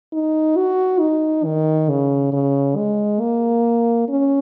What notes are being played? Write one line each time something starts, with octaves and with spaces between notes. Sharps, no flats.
D#4
F#4
D#4
D#3
C#3
C#3
G#3
A#3
C#4